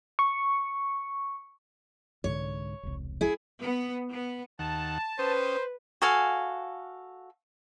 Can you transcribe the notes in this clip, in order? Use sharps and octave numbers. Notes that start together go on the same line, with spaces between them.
C#6
C2 G#2 D3 C#5
E1 C2
E4 G#4
B3
B3
D#2 D#3 F#5 A5
C#4 B4 C5 G5 D#6
F#4 A4 F5 G#5